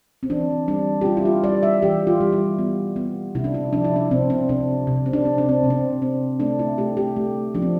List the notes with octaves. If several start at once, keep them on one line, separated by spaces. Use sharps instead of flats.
C4
E3 D4
G3 D4
G4
G3 F4
E4
F4
G3 D5
E5
E3 G4
F4
G3
E4
B3
B3
C3 E4
D4
E4
F3 D4
E4
D4
C3 C4
C4
C3 D4
C3
C4
D4
C4
D4
C4
C3
C4
C4
A3 D4
E4
A3 G4
G4
A3
F3 D4
C4